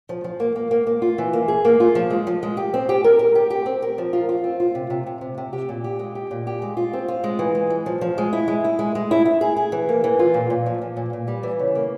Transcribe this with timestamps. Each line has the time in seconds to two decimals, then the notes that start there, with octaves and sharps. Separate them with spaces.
0.09 F3
0.24 F3
0.40 A#3
0.56 A#3
0.71 A#3
0.87 A#3
1.02 F4
1.18 E3
1.33 A#3
1.48 G#4
1.65 A#3
1.80 F4
1.95 F3
2.10 G#3
2.27 F3
2.43 G#3
2.57 G4
2.74 C4
2.89 G4
3.04 A#4
3.19 A#4
3.35 G4
3.50 G4
3.66 C4
3.82 A#4
3.98 F3
4.13 F4
4.29 F4
4.44 C4
4.60 F4
4.75 C3
4.90 C3
5.06 C3
5.21 C3
5.38 C3
5.53 G4
5.69 A#2
5.84 G4
5.99 G#3
6.15 G4
6.31 A#2
6.47 G4
6.62 G#3
6.77 F4
6.93 C4
7.08 F4
7.24 G#3
7.39 E3
7.55 G#3
7.70 G#3
7.86 F3
8.01 F3
8.18 G#3
8.33 E4
8.48 G#3
8.64 E4
8.79 G#3
8.95 G#3
9.11 E4
9.25 E4
9.41 G#4
9.57 G#4
9.72 E3
9.89 A#3
10.04 E3
10.19 F4
10.34 A#2
10.50 A#2
10.66 F3
10.82 F3
10.97 A#2
11.13 A#2
11.28 G3
11.43 E3
11.59 C#3
11.75 A#3